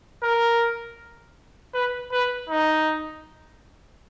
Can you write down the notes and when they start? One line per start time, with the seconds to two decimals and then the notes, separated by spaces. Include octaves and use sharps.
0.23 A#4
1.74 B4
2.12 B4
2.49 D#4